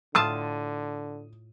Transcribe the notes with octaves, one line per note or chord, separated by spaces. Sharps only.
A2 D3 F4 A5 D#6